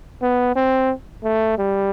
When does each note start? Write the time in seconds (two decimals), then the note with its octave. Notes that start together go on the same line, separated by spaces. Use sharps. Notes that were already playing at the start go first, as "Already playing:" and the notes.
0.22 B3
0.56 C4
1.24 A3
1.58 G3